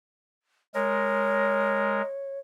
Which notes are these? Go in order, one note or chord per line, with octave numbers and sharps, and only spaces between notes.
G#3 A#4 C#5